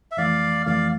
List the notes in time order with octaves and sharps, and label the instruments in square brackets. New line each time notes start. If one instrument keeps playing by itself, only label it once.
[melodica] E5
[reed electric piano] F2 E3 A3 [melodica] D5 F5
[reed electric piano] F2 E3 A3 [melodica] D5 F5